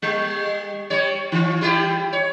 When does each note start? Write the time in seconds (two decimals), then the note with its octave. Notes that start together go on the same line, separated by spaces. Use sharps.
0.02 G3
0.90 G3 C#5
1.32 D#3 F4
1.61 G3 E4 G4
2.13 C#5